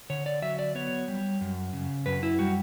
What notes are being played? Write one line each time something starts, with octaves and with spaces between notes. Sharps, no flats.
D3 C#5
D5
F#3 E5
D5
B3 C#5
G3
F#2
C#3
F#2 B4
E4
G3 F#4